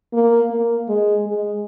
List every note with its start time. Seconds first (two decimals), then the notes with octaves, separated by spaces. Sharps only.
0.13 A#3
0.51 A#3
0.89 G#3
1.26 G#3